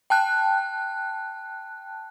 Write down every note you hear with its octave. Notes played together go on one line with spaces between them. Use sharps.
G5 A5 F#6